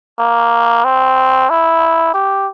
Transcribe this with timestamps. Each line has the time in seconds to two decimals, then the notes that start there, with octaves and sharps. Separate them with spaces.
0.19 A#3
0.85 C4
1.50 E4
2.14 G4